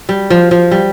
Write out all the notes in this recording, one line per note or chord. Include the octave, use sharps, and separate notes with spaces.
G3
F3
F3
G3